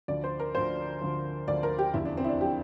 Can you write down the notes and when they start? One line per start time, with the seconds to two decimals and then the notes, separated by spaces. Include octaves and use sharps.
0.08 D2 D3 F3 D5
0.24 C5
0.40 A#4
0.55 D2 D3 F3 C5
1.01 D2 D3 F3
1.48 D2 D3 F3 D5
1.63 A#4
1.79 G4
1.94 F1 E2 D3 F3 E4
2.05 D4
2.17 C4
2.24 E4
2.29 D4
2.41 D3 F3 G4